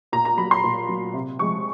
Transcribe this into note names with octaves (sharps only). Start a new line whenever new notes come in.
A#2 A#5
A#5
F#3 B5
C6
A#2
F#3
C3
F3 G#3 C#6